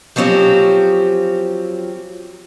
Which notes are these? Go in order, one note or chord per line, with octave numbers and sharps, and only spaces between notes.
F3 F#3 C4 C#4 G4